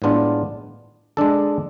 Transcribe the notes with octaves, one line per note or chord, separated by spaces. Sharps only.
A2 G#3 B3 D4 F4
G#3 D4 A4